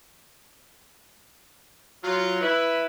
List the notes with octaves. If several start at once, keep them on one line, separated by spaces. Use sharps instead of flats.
F#3 F4
E4 B4